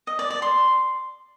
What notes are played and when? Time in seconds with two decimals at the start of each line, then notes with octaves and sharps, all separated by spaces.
0.07 D#5
0.19 D5
0.30 D5
0.42 C6